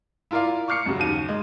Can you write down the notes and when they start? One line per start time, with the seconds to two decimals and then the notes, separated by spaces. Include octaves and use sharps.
0.31 E4 F4 A#4 D5 F5
0.68 C#6 D6 F6 C7 C#7
0.86 F#2 C#3 F#3 G3
0.99 D#2 D#7
1.29 G#3